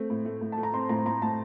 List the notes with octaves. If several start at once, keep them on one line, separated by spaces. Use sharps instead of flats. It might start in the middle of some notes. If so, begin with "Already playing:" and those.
Already playing: A3 C4
A2
A3
A2
A5
A3
A#5
C4 C6
A2 A#5
A2 A#5
A2 A5